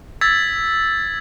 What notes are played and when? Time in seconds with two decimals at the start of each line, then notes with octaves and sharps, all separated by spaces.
0.21 E6 G#6 A6 B6